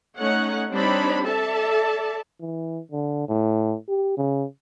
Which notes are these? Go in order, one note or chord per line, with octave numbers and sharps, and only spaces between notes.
A3 C#4 D#4 C#5 F#5
G3 C4 D4 D#4 C#5 B5
A4 D5 E5 A5
E3
D3
A2
G4
C#3